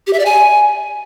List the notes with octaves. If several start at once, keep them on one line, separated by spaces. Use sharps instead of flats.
G4
E5
D5
G#5